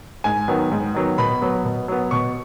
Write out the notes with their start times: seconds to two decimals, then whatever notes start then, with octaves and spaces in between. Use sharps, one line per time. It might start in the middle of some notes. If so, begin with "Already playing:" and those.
0.24 G#2 G#5
0.48 D#3 F#3 B3
0.72 G#2
0.94 D#3 F#3 B3
1.18 B2 B5
1.41 F#3 B3
1.65 B2
1.88 F#3 B3
2.11 B2 C#6